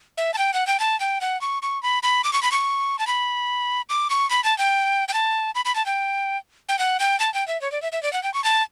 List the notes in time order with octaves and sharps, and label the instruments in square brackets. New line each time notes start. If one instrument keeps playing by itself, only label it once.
[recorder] E5
A5
G5
F#5
G5
A5
G5
F#5
C#6
C#6
B5
B5
D6
C#6
B5
C#6
A5
B5
D6
C#6
B5
A5
G5
G5
A5
B5
B5
A5
G5
G5
F#5
G5
A5
G5
E5
C#5
D5
E5
E5
D5
F#5
G5
C#6
A5